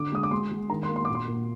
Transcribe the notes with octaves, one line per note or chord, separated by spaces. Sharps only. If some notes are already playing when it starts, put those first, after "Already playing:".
Already playing: D3 D6
G#3 D#6
D6
G#3 C6
G#3
D#3 A#5
C6
A#3
C6
A#2 D6
C6
A#2